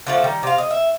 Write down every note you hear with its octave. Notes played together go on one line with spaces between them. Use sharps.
D3 F3 A3
D#3 G3
C3 F5
D#5
E5